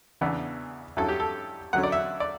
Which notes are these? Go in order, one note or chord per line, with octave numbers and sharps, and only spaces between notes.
E2 C#3 E3 B3 D4
G2 F#3 C#4 E4 A4
G4
A4
F#2 D3 F#3 C#4 F#5
D5
E5
D5